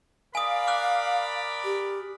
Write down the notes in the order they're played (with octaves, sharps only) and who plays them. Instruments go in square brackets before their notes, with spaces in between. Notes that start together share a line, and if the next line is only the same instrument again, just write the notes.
[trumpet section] A#4 D5 B5 [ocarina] F5 [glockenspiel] G#5 D#6
[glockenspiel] D6 F6 F#6
[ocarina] G4